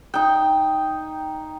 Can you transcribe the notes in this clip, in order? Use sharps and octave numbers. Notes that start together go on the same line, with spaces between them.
D#4 G5